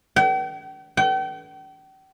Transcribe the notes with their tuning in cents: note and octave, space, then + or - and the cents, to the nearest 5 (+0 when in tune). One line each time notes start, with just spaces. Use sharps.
G5 -45
G5 -40